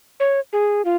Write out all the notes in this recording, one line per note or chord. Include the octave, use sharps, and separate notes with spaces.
C#5
G#4
F4